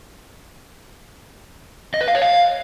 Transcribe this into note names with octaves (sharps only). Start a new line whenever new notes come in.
D#5
B4
F5
C#5
F5